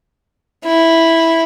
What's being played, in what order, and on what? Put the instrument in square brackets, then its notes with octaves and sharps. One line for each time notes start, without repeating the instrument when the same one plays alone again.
[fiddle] E4